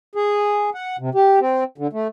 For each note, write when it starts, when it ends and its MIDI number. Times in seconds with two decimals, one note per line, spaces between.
0.15 0.70 68
0.75 0.97 78
0.99 1.10 48
1.15 1.39 67
1.40 1.64 60
1.78 1.87 50
1.93 2.08 57